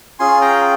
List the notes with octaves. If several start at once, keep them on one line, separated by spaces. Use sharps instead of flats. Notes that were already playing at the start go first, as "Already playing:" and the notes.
C#4 F4 G#4 G#5 C6
G5 A#5